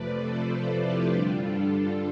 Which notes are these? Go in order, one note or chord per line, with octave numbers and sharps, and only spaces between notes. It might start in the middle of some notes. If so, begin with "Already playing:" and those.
Already playing: F2 C3 F3 A3 B4 D5
A4 C5
F4 A4
E4 G4
G2 D3 G3 D4 F4
F4 A4